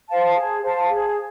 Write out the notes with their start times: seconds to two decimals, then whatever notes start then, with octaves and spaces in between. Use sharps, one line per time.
0.08 C5 F5 A5
0.35 G#4
0.62 C5 F5 A5
0.89 G#4